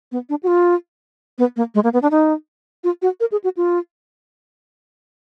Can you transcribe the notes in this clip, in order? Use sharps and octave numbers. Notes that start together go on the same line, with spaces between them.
B3
D4
F#4
F4
B3
A#3
G#3
A#3
B3
D4
D#4
F4
F#4
A#4
G#4
F#4
F4